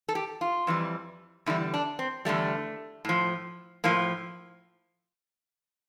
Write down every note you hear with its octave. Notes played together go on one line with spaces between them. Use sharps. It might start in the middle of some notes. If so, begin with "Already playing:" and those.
A4
G4
F4
F2 E3 G3
E2 D3 G3 E4
D4
C4
E2 D3 G3 A3
A2 F3
A2 F3 A#3